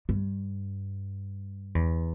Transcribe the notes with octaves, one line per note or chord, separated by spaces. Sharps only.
G2
E2